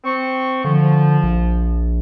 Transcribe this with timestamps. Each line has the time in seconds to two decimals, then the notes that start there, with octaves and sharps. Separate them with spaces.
0.04 C4 C#6
0.64 D3 F3
1.23 A#1